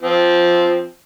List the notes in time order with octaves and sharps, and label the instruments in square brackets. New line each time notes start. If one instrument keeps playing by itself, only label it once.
[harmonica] F3 C4